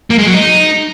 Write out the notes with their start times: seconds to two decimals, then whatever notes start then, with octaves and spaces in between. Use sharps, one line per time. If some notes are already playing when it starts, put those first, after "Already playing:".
0.10 A#3
0.18 G#3
0.26 F#3
0.34 D#4